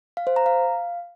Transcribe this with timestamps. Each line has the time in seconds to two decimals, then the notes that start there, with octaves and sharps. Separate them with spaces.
0.17 F5
0.27 C5
0.36 A#5
0.46 F5